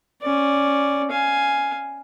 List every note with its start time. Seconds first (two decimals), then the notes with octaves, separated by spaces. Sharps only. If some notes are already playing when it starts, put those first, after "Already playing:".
0.22 C#4 D5
1.11 F5 G#5